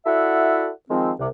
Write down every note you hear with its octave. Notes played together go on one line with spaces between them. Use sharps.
E4 F#4 A4 D5 E5 F#5
D#3 F3 G#3 C4
C2 C3